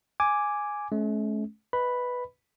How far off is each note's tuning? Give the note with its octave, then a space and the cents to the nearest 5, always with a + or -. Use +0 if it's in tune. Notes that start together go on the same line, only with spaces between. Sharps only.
G#5 +0 D6 +0
A3 -45 C#4 +0
B4 +0 D#5 +0 B5 +0